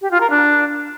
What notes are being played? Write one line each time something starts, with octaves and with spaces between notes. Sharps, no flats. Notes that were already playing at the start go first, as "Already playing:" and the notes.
G4
F4
A#4
D4